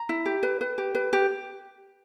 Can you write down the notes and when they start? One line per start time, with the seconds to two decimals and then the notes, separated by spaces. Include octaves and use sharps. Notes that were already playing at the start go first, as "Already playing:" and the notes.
Already playing: A#5
0.09 E4
0.26 G4
0.43 B4
0.61 B4
0.78 G4
0.95 B4
1.13 G4